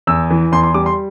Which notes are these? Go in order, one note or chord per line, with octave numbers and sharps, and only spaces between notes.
E2 E6
E3
E2 C6
C6
G3 D6
C6